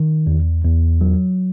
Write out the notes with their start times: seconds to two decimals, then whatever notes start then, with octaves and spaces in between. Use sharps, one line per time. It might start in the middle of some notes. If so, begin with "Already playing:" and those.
Already playing: D#3
0.27 E2
0.64 E2
1.01 F#3